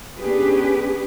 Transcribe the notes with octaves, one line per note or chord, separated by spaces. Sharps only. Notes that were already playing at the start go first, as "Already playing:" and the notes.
B3 C#4 D4 G4 G#4 B4